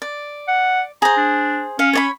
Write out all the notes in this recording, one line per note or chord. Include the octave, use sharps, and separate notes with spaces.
D5
F#5
G#4 C5 A#5
D4
C#4 F5
C#5 D5 B5